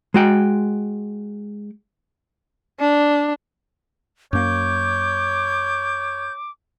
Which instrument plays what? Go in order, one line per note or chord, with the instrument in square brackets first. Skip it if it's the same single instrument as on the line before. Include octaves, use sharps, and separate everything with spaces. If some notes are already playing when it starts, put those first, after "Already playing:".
[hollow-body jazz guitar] G#3 F#4 G5
[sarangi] D4
[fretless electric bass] F#2 A#3 [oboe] C#5 [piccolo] D6 [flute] G6